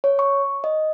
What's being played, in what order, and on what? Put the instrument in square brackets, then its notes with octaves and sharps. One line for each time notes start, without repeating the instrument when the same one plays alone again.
[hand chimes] C#5
C#6
D#5